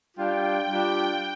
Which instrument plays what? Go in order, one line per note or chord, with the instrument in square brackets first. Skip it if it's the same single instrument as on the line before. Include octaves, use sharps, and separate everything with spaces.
[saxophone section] G3 D4 F4 [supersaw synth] G5
[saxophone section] G3 D4 F4